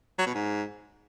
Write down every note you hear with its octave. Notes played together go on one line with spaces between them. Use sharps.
F#3
B2
G#2